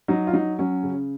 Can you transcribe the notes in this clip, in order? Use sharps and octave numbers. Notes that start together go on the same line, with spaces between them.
F#3 D#4
F4
F#3 D#4
F#3 C#4
C#3